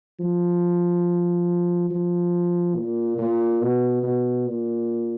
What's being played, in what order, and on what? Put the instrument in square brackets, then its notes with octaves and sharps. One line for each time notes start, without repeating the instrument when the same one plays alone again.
[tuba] F3
F3
A#2
A#2
B2
B2
A#2